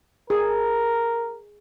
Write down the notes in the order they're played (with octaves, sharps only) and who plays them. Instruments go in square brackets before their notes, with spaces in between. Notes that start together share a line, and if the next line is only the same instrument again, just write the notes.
[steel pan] G#4 [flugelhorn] A#4